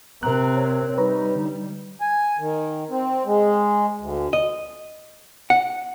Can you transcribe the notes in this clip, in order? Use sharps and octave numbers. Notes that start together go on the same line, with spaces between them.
C3 C4 A#4 A#5 F#6
C#5
G3 D#4 B4 C#5 A#5
D3
G#5
D#3
C4
G#3
D2
D#5
F#5